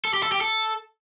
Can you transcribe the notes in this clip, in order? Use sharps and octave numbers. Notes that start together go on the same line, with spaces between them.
A4
G4
A4
G4
A4